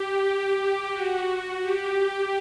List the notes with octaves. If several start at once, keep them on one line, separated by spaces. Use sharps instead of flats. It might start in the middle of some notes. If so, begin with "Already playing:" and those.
Already playing: G4
F#4
F#4
G4
G4